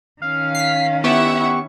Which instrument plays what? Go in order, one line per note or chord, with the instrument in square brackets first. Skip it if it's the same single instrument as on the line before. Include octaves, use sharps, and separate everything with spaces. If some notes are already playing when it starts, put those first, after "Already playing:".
[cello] D#3 C#4 [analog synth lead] F5
[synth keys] B6 C7
[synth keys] B3 G4 [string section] E4 E5 F#5 [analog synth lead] C#6